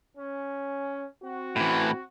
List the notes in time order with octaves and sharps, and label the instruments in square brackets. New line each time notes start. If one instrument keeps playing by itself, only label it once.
[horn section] C#4
C4 F#4
[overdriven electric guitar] A2 E3